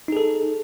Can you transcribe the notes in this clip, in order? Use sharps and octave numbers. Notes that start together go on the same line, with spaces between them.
D#4 G#4 A4